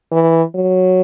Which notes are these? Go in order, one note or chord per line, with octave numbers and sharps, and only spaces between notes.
E3
F#3